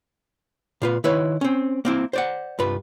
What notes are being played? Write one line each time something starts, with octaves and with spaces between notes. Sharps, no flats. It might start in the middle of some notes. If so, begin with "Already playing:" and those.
A#2 F4 B4
D#3 E4 B4 C#5
C4 C#4
A#3 C4 E4
C5 D5 F#5
C2 G2 F4 B4